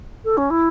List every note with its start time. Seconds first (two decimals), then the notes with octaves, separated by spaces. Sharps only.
0.24 A4
0.37 C#4
0.50 E4